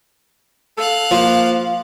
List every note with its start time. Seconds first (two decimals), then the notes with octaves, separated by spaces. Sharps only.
0.78 A4 F5 F#6
1.11 F3 A#3